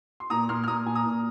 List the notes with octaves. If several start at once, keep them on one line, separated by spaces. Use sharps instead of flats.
C6
A#2 A#5 D#6
A#2 C6 F6
F6
A#2 A#5 D#6
A#2 G#5
A#5 D#6
A#2